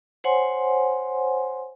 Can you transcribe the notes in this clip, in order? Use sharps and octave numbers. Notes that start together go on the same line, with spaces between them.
C5 C#5 F#5 G#5 C6